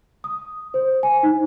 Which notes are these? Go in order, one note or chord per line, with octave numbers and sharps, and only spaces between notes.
D#6
C5
G#5
D#4